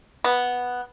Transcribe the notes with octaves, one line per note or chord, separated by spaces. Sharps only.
B3